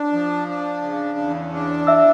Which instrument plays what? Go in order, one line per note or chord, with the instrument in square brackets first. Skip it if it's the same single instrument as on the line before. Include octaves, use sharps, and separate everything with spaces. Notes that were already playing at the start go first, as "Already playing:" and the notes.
Already playing: [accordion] D4
F3
D4
C#3
E2
D4
[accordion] E3 [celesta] E5 E6